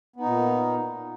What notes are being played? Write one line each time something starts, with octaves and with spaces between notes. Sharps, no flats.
A#2 B3 D#4